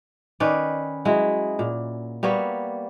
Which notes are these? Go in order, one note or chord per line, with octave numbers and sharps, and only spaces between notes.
D#3 C#4 B4 D5
F#3 G#3 E4
A#2
G3 A#3 B3 C#5